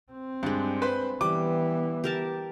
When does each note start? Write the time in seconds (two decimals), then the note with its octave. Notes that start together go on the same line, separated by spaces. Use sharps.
0.13 C4
0.43 G2 G#3 D4
0.82 B4 C5 B5
1.21 E3 G3 B3 D6
2.04 G4 A#4 A5